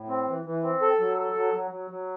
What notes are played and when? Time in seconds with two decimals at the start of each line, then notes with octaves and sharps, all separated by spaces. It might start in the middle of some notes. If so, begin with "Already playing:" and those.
Already playing: A2
0.09 C4
0.27 E3
0.45 E3
0.63 C4
0.82 A4
0.99 F#3
1.17 A4
1.36 F#3
1.53 F#3
1.71 F#3
1.90 F#3